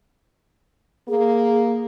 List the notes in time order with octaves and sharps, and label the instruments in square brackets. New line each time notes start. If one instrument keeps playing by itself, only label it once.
[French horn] A#3 [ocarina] G#4